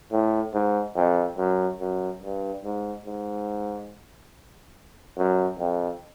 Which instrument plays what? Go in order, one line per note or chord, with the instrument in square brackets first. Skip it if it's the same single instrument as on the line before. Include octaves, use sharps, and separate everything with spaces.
[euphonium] A2
G#2
F2
F#2
F#2
G2
G#2
G#2
F#2
F2